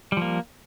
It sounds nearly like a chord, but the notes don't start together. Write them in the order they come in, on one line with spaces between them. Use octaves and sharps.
G3 F3 A#3